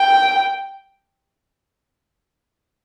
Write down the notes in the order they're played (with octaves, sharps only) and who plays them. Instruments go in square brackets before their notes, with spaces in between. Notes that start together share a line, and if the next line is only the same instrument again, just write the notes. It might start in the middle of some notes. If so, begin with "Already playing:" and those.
Already playing: [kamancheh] G5